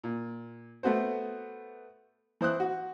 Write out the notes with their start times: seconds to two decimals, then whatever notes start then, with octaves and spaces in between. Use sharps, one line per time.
0.04 A#2
0.83 A3 B3 F#4 C5
2.41 E3 C5 D#6 F#6
2.60 F#4